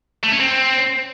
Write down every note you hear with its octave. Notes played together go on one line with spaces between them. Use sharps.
A3
C#4
C4